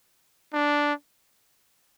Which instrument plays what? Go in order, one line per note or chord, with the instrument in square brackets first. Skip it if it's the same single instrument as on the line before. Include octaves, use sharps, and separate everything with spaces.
[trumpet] D4